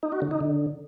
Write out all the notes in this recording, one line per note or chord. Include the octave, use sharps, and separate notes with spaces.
D#4
F#4
D3
D#4
D3